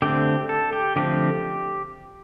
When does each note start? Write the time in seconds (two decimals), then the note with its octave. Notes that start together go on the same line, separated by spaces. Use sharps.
0.02 D3 A3 C4 G4
0.49 A4
0.73 G4
0.96 D3 F3 A3 C4 G4